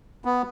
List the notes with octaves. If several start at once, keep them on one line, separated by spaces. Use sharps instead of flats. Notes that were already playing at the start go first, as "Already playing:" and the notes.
B3